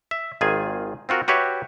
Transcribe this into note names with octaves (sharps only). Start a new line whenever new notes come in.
E5
G#1 D#3 F4 G#4 G#5
C4 F4 F#4 A#4
F#4 G4 B4 C#5 E5